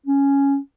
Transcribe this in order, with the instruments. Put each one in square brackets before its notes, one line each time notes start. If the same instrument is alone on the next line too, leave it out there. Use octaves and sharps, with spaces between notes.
[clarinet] C#4